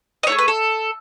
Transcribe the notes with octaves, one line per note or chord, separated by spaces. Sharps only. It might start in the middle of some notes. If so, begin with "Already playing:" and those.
D#5
A3 D#4 C#5
G#4
B4
A4